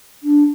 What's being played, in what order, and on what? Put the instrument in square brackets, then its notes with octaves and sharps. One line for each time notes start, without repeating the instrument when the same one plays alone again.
[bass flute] D4